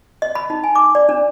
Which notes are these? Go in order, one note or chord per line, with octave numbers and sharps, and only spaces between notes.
D#5
B5
D#4
G#5
D6
D5
D4